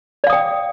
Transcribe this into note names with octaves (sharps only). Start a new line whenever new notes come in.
D5 F5 G5 D#6